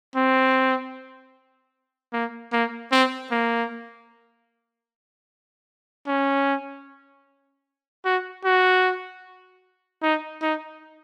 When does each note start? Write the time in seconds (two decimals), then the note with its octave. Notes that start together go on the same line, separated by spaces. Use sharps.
0.16 C4
2.13 A#3
2.52 A#3
2.92 C4
3.31 A#3
6.07 C#4
8.05 F#4
8.45 F#4
10.03 D#4
10.42 D#4